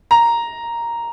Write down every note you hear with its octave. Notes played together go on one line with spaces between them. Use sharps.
A#5